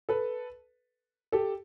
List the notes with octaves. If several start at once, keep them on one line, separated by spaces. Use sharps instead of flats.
A4 B4
G4 A4